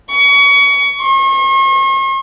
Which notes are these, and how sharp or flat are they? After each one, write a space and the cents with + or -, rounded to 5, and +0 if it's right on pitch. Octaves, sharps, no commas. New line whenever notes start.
C#6 +30
C#6 -45